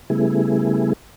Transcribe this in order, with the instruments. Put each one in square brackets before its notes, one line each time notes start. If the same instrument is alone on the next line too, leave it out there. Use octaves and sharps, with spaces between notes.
[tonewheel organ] C#3 G3 A3 B3 E4 G#4